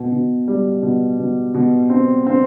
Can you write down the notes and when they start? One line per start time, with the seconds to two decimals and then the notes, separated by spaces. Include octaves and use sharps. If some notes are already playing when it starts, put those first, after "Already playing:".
Already playing: B2
0.12 B2
0.48 G3
0.82 B2
1.19 B2
1.54 B2
1.90 C4
2.27 C4